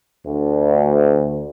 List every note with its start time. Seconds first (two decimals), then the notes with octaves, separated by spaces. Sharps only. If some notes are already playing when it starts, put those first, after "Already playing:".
0.25 D2